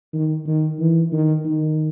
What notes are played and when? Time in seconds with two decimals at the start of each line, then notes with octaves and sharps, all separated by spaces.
0.13 D#3
0.47 D#3
0.79 E3
1.12 D#3
1.45 D#3